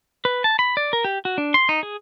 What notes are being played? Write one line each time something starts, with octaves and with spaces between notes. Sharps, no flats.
B4
A5
B5
D5
A#4
G4
F#4
D4
C6
D#4
G#4